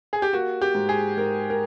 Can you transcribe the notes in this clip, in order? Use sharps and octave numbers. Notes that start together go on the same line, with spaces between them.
G#4
G4
A#3 F#4
G4
G#2
G#4
G#2 A#4
A#4